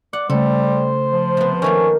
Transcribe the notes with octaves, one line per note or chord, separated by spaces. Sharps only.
D5 F#5
C#3 G3 A3 A4 C5
F3
C3 B3
D#3 A3 A#3 C#4